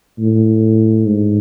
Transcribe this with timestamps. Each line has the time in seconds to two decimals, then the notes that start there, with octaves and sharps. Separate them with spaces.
0.19 A2
1.07 G#2